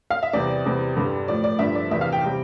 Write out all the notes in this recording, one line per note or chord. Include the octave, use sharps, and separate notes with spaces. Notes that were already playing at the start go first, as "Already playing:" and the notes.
F5
E5
E2 C3 G3 D5
E2 C3 G3
G2 D3 G3
A2 F3 D5
D5
G2 D3 F3 E5
D5
E2 C3 E3 E5
F5
G5
C3 G3